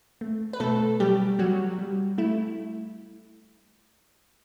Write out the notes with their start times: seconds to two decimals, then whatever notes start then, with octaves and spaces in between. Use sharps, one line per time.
0.21 A3
0.53 B4
0.60 B2 A3 A4
1.00 F#3 G3 G4
1.39 F#3 G3 F#4
1.79 G3
2.18 A3 E4